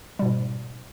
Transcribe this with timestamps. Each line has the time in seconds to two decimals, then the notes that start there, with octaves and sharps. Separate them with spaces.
0.19 G3
0.22 B2
0.25 G#2